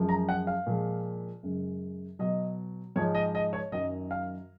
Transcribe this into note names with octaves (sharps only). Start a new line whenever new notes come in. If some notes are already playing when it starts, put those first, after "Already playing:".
Already playing: F#2 F3 G#3
A#5
F#5
F5
A#2 F3 G#3
F#2 C#3 G#3
B2 F#3 D#5
G#2 F3 G#3 C#5
D#5
D#5
C#5
F#2 D#3 F#3 D#5
F5